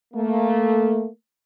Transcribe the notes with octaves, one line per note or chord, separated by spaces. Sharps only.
A3 A#3